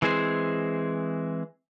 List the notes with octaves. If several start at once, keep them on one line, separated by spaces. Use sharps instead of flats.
E3 G#3 C4 G#4 C5